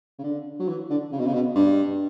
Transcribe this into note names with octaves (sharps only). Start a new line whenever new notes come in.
C#3
D3
F#3
E3
D3
C#3
B2
C#3
B2
G2